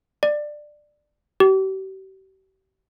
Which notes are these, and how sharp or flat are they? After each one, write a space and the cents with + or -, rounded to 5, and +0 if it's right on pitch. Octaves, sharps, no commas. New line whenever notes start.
D5 +15
G4 -40